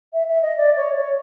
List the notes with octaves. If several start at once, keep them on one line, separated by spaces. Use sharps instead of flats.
E5
E5
D#5
D5
C#5
C#5